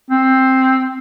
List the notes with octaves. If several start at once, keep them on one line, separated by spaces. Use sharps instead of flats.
C4